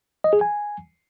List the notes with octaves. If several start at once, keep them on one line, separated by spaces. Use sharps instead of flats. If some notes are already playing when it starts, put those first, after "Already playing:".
D#5
G#4
G#5